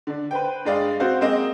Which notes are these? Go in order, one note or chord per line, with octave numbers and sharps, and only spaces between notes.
D3 D4
B4 C5 G5
G2 G#3 D5 F5
C4 F#4 C5 F5
G#3 A#3 C4 D#5